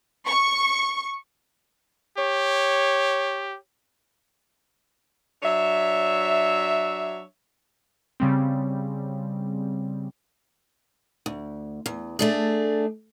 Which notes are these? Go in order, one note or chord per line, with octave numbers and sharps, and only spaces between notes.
C#6
G4 C#5
F#3 D4 C#5 E5
C#3 G3 C4
D2
E2
A3 D4 G#4